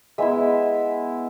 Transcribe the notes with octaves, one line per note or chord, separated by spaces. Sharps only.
G#3 B3 E4 E5